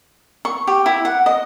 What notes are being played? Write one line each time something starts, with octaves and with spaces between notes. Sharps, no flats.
C#6
G4
E4
F#5
D#5